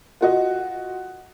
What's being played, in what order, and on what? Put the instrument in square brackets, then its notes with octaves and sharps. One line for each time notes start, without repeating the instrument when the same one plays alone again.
[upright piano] F4 F#4 D#5